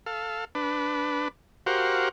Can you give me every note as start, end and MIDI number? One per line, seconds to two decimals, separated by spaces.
0.06 0.45 69
0.06 0.45 77
0.55 1.28 62
0.55 1.28 71
1.66 2.09 66
1.66 2.09 67
1.66 2.09 70
1.66 2.09 72
1.66 2.09 77
1.66 2.09 78